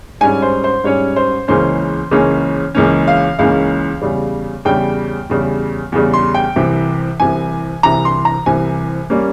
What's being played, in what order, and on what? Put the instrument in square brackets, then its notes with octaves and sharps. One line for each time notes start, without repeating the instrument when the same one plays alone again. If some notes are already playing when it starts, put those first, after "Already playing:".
[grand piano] G#2 G3 C#4 G#5
C5
C5
G#2 G3 C#4 C#5
C5
C#2 C#3 E3 A#3 C#4 C5
C#2 C#3 E3 A#3 C#4
C#2 C#3 E3 A#3 C#4
F5
C#2 C#3 E3 A#3 C#4 F5
E2 C#3 G3
E2 C#3 G3 G5
E2 C#3 G3
E2 C#3 G3
C6
G5
C2 C3 E3
C2 C3 E3 G#5
C2 C3 E3 A#5
C6
A#5
C2 C3 E3 G#5
G3 A#3 C#4